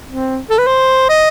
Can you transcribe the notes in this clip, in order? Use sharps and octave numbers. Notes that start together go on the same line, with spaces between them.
C4
A4
B4
C5
D#5